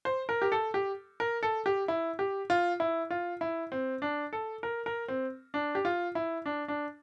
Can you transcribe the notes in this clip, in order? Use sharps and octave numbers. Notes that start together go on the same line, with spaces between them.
C5
A#4
G4
A4
G4
A#4
A4
G4
E4
G4
F4
E4
F4
E4
C4
D4
A4
A#4
A#4
C4
D4
G4
F4
E4
D4
D4